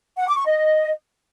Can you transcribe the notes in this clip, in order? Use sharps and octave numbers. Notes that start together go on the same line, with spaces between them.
F#5
D6
C#6
D#5